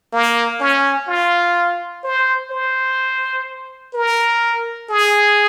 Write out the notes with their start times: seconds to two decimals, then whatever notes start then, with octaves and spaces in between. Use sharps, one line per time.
0.12 A#3
0.60 C#4
1.08 F4
2.04 C5
2.51 C5
3.94 A#4
4.89 G#4